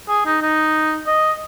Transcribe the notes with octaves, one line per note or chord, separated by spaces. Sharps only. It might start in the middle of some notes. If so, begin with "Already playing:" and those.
G#4
D#4
D#4
D#5